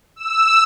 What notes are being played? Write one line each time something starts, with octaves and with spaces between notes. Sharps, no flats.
E6